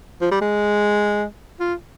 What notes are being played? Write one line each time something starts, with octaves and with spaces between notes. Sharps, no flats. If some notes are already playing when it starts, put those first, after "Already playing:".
F3
G3
G#3
F4